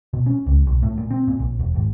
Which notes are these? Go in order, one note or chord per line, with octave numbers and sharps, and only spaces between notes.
B2
C#4
C#2
B1
A2
A#2
C4
A#2
A#1
E1
G#1